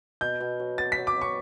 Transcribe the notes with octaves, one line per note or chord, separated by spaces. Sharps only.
B2 G6
B2
F#3
B3 A6
B6
F#3
D6
F#3
C#6